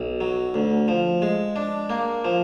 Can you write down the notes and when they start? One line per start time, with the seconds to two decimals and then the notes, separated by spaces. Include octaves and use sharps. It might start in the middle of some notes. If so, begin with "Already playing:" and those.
Already playing: B1
0.21 F#3
0.54 D2
0.88 F3
1.22 G#3
1.56 D4
1.90 A#3
2.25 F3